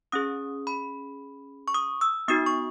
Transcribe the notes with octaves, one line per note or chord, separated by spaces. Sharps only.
C#4 G#4 D#6
B5
C#6
D#6
E6
B3 D#4 F#4 D#6
C#6